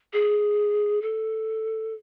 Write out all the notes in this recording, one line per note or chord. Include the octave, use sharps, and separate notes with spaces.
G#4
A4